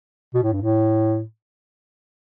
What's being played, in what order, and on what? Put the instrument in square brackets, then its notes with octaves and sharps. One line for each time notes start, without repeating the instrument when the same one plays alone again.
[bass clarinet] B2
A2
G2
A2